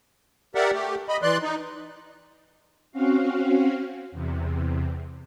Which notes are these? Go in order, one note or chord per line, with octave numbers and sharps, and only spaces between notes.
G4 A#4 D5 E5 F#5
A3 G4
D#5 B5
E3 D5 C6 F#6
D#4
C4 C#4 F#4 F5
E2 C3